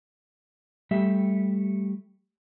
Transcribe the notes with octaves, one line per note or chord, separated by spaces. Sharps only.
G3 A3 G4 E5